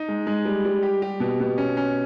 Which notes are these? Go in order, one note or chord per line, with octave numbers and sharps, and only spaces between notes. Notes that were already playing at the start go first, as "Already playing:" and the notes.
Already playing: D#4
G#3
G#3
G3
G3
G4
G4
B2
B2
C#4
C#4